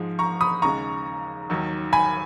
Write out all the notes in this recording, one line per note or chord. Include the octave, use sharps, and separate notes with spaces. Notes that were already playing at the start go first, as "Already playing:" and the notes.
Already playing: G#2 F3 G#3
A#5 C#6
B5 D#6
D#2 C#3 G#3 A#5 C#6
D#2 D#3 F#3
G#5 B5